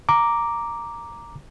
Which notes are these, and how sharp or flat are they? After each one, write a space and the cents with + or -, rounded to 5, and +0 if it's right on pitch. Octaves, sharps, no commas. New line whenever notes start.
A#5 +0 D6 +0